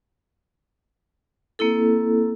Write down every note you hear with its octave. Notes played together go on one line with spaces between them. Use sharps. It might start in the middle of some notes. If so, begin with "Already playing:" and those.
A#3 C4 E4 A4